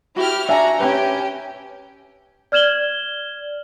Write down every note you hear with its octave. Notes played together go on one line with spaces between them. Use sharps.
E4 F#4 G4 F6
D4 F#4 E5 G#5 A#5
C#4 G4 B4
D5 F6 G#6 E7 F#7 G7